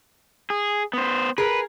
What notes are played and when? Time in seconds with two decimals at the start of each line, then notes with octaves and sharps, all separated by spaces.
0.50 G#4
0.93 B3 C5
1.38 G#4 A#4 B4